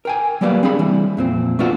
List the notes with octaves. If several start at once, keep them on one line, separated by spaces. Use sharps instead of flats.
A#4 G5 G#5
F#3 G3 A#3 B3 D5 F5
C4 D4 G#4 B5
E3 G3
F2 A#2 C4
A3 B3 D4 F4 F#4